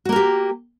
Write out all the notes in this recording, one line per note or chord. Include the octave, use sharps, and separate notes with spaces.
A#3 F#4 G4 A#4